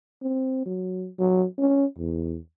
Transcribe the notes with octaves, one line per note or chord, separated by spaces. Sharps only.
C4
F#3
F#3
C#4
E2